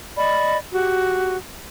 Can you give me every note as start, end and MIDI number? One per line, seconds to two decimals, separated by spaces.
0.17 0.57 74
0.17 0.57 75
0.17 0.57 83
0.72 1.35 66
0.72 1.35 67